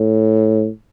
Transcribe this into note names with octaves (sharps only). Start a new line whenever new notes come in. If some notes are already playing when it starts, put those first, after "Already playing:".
Already playing: A2